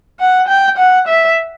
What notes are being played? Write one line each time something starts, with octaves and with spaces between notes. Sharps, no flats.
F#5
G5
F#5
E5